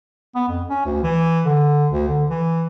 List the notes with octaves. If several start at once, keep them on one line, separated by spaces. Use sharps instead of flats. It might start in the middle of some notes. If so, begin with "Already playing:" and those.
B3
F2
C#4
D2
E3
D3
D2
D3
E3